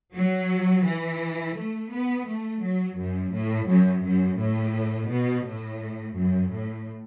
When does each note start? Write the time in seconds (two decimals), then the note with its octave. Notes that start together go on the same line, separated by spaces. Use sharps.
0.15 F#3
0.84 E3
1.56 A3
1.90 B3
2.26 A3
2.62 F#3
2.97 F#2
3.32 A2
3.67 F#2
4.03 F#2
4.38 A2
5.08 B2
5.45 A2
6.15 F#2
6.50 A2